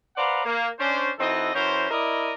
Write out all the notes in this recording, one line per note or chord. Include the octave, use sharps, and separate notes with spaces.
B4 C5 D5 F5 F#5 A#5
A#3
C#4 D4 C5
E3 C4 D#4 F#4 A4 D#5
E3 C#4 F#4 A#4 C5
E4 A#4 D5 D#5